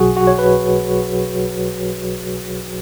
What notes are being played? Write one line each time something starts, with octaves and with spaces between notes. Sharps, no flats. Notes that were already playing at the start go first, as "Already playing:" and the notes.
Already playing: B1 B2 F#3 F#4 G#4
F#4
C#5
B4